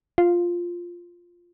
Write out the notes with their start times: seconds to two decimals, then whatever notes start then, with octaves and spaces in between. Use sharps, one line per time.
0.18 F4